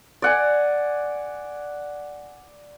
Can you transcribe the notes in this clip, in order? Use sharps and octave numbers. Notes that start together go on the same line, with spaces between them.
D5 F#5 G#5